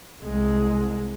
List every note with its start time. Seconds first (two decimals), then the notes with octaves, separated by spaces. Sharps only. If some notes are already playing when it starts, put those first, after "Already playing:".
0.22 C2 G#3